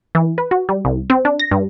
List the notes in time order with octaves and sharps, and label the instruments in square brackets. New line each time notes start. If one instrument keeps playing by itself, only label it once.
[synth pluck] E3
B4
F#4
G3
C2
C4
D4
A#6
G2